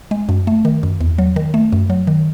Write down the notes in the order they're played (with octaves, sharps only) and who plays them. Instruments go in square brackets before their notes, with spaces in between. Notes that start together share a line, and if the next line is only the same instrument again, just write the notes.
[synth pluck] G#3
F#2
A3
D#3
F#2
E2
F#3
D#3
A3
F#2
F#3
D#3